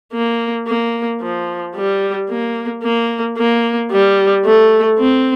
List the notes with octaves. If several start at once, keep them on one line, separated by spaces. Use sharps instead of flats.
A#3
A#3
F3
G3
A#3
A#3
A#3
G3
A3
C4